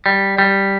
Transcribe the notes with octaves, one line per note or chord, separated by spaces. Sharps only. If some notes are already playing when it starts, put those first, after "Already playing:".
G3
G3